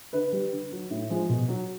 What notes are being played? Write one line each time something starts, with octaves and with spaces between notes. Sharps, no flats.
D3 B4
G3
D3
F#3
A2
F3 G#3
B2
F#3